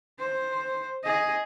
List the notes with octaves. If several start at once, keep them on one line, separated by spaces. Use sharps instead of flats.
C5
G#4 D#5